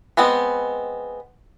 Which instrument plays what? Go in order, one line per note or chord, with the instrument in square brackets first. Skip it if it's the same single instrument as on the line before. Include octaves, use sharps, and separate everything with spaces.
[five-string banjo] G#3 B3 C4 B4